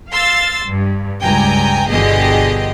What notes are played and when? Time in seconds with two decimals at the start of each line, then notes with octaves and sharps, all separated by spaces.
0.11 F5 C6 E6 A6
0.67 G2
1.21 C#2 G2 G5 G#5 A#5
1.91 G1 B2 D3 G4 G#4 D#5